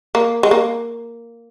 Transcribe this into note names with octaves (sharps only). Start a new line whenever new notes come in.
A#3
G#3
A#3